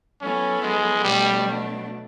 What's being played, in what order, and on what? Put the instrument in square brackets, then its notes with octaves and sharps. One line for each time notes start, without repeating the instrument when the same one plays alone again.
[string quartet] F#3 B3 E4 A4 [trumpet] C#4
[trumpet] G#3
[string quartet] B2 F#3 A3 D4 [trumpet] G3